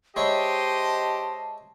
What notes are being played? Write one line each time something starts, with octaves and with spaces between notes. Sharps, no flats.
G#3 E4 G4 C5 C#5 D#5 A5